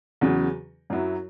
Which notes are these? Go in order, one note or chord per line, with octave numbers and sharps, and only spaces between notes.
E2 C#3 F#3
F#2 F#3 E4